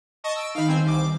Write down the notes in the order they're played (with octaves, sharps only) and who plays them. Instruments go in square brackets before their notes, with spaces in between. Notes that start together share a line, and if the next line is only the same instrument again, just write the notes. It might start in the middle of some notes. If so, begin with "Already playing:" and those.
[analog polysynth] D#5 A5 C#6
E6 D7
[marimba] D#3 D#4 [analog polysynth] F5 B5
[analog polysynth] G1 C4 G#5
C2 D6